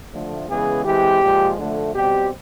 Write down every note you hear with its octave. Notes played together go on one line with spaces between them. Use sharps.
D3 F3 A3
C#3 E3 G#3 B3 G#4
E3 G#3 C4 G4
A#2 F3 G#3
D3 F3 A3
B2 G3 C4 G4